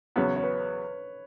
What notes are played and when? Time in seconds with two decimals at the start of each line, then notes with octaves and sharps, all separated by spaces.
0.16 E2 C#3 F#3 B3 C#5
0.36 C#5
0.43 B4